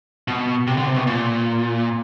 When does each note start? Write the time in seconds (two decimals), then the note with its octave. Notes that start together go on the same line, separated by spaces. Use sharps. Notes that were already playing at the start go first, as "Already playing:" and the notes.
0.28 B2
0.67 C3
0.77 D3
0.87 C3
0.96 B2
1.07 A#2